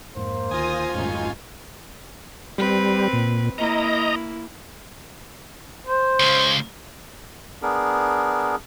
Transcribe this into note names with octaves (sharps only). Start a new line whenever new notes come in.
F2 G#2 A#3 C5
D2 D#3 F4 G#5 D#6 A#6
G#1 F2 G3 A3 C#4 D#4
G3 C4 B4
A#2
A#3 E4 D#5 A#5
C5
C#2 C#3
B3 D4 G#4 A#4